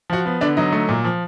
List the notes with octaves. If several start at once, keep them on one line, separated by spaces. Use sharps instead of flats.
F3 F#4 F#5
B3
D3 D4 D5
F#3 D#4 D#5
A3
A#2
F3